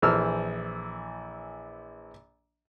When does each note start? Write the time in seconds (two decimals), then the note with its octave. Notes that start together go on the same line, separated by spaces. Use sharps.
0.02 A#1 E3 A4 C5 E6 F6